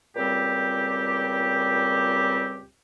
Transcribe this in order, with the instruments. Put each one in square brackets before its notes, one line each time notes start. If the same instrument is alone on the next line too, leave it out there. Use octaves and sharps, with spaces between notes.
[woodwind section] C#2 A#2 G3 C4 G4